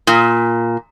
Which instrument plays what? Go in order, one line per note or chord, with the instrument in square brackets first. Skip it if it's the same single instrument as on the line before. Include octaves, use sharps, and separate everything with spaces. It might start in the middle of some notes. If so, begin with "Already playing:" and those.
[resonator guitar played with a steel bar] A#2